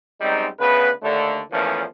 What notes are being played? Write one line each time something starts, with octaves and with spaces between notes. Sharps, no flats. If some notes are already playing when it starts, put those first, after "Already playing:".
F#2 G3 G#3 C4 D#4
D2 C#3 B3 B4
D#2 D3 A3
E2 A#2 E3 F3 A3 C#4